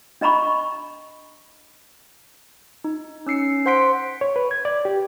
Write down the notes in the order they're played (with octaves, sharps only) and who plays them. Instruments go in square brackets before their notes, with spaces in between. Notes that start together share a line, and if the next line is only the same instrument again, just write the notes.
[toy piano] D4 D#5 A#5 B5 C#6
[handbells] D#4
C#4 E6 C7 C#7
C5 F#5 C6 B6 D7
[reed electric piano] C#5
B4
G#6
D5
G4